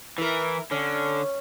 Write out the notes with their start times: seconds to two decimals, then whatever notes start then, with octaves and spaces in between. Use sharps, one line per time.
0.18 E3 E4 A#4
0.71 D3 C#4